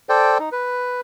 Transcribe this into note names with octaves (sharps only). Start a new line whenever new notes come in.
A4 C5 D5 G5
D#4
B4